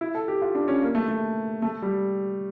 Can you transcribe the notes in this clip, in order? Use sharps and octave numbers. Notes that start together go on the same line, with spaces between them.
E4
A4
G4
F4
D4
C#4
A#3
A3
A3
A3
G3